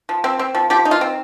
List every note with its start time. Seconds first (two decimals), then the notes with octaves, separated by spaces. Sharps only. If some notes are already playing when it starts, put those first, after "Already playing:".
0.09 F3
0.24 C4
0.39 C4
0.55 F3
0.70 F3 G4
0.85 D#4
0.91 F4
1.01 C4